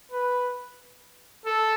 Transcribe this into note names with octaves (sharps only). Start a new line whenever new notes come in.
B4
A4